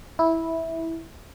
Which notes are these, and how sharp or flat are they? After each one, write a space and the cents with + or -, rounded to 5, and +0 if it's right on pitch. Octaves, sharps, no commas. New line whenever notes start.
E4 -10